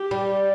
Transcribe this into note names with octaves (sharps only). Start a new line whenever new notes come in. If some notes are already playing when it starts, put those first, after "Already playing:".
Already playing: G4
G3